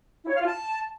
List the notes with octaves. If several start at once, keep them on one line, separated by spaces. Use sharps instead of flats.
E4
C#5
F5
F4
A5